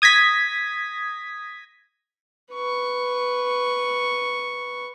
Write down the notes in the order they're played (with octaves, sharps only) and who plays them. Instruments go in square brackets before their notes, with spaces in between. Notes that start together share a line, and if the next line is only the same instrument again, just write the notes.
[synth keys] D#6 G#6 A#6 B6
[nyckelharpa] B4 C#6